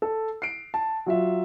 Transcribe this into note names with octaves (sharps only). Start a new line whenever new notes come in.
A4
C7 D7
A5
F#3 F4 E5